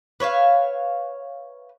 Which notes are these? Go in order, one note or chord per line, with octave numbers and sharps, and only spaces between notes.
B4 C#5 E5 F5